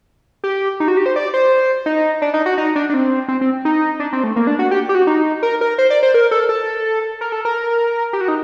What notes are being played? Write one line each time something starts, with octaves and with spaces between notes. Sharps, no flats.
G4
D#4
F#4
G4
C5
D5
C5
D#4
D4
D#4
F#4
D#4
D4
D4
C4
C4
C4
D#4
D4
C4
A3
A#3
D4
F#4
G4
G4
F#4
D#4
A#4
A#4
C5
D5
C5
A#4
A4
A4
A#4
A4
A#4
G4
F#4
D#4